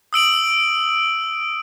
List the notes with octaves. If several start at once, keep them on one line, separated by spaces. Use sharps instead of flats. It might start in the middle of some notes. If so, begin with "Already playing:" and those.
D#6 E6 D7 F#7